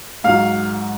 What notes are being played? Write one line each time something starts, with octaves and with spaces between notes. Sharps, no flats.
G#2 F#3 F5